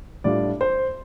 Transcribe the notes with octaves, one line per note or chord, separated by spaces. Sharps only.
A2 G3 D4 F4 D5
C5